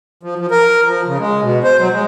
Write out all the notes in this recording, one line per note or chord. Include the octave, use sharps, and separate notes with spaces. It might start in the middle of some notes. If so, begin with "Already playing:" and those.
F3
F3
A#4
F3
C#3
G#3
B2
C5
F#3
G#3